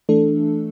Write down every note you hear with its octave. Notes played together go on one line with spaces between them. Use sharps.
E3 A3 D4 A4